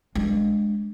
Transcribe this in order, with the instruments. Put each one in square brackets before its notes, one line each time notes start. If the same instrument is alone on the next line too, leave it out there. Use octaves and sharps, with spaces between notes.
[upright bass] G#3 D4